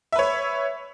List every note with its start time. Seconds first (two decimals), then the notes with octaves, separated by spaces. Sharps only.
0.12 E5
0.16 B4
0.19 C#5